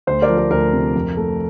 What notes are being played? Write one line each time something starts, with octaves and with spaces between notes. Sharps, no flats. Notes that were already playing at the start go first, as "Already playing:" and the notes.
D2 C5
A#4 D5
F3
A#4
D2 A#4
C3
F2
A3